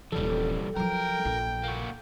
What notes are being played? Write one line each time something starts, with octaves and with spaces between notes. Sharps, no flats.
D#1 E3 F3 G3 A4
F3 F#3 A#4 G5
A#1 F4
A#3 F#4